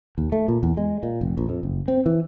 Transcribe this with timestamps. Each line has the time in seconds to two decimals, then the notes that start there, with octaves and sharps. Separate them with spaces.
0.18 D#2
0.32 A3
0.48 A#2
0.63 E2
0.77 G#3
1.03 A#2
1.21 F1
1.37 A#1
1.49 F2
1.63 F#1
1.88 C4
2.06 E3